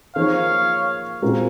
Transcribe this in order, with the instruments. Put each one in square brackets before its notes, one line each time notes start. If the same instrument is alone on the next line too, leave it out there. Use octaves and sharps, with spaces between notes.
[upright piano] F3 A#3 D#4 G#4 C5 [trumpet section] C#5 F5
[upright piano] A#2 G#3 C4 F#4 A#4